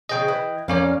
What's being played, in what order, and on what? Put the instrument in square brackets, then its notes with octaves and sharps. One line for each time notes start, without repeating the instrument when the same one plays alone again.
[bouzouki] C#3 F3 G#4 [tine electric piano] D#5 G5
[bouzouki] E3
[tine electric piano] F2 C#4 C#5 [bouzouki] A#4 D5 F5